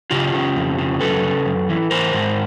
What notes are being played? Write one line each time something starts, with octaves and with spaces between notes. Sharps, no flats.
C#3 F4 G4
C#3
F2
C#3
F#2 A4 B4
C#3
F#2
E3
E3 A#4 C5
G#2